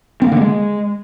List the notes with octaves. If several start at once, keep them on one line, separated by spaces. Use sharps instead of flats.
C4
A#3
D3
A#3
G#3